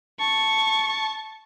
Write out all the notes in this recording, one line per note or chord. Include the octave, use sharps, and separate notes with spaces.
A5 C#6